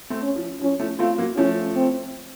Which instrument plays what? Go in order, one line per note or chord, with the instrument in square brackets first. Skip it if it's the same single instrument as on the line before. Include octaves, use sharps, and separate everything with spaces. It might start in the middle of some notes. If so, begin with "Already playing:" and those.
[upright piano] A3 C4
[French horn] C#4
[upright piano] F3
[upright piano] F3 [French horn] C#4
[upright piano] F3 A3
[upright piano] A3 C4 [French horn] F4
[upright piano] F#3 A#3
[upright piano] F3 A3 [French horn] C#4
[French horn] C4